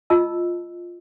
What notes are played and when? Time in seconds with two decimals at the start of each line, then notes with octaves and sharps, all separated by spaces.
0.10 F4 D#5 A5 E6